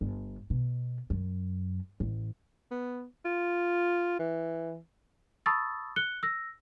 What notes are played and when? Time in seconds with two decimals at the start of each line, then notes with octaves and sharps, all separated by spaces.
0.01 G1
0.50 B2
1.10 F#2
2.00 A1
2.71 B3
3.25 F4
4.19 E3
5.46 A5 B5 C#6 D#6 E6 A6
5.96 F#6 C#7 G7
6.23 E6 A#6